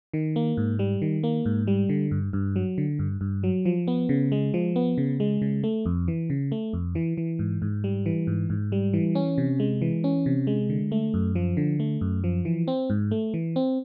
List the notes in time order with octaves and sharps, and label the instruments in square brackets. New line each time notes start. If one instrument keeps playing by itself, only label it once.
[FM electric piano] D#3
A#3
G#2
G3
D#3
A#3
G#2
G3
D3
G2
G2
F#3
D3
G2
G2
F#3
F3
B3
C#3
G#3
F3
B3
C#3
G#3
C#3
A3
F2
E3
C#3
A3
F2
E3
E3
G#2
G#2
G3
E3
G#2
G#2
G3
E3
C#4
C3
G#3
E3
C#4
C3
G#3
D3
A3
F#2
F3
D3
A3
F#2
F3
E3
C4
G#2
A3
E3
C4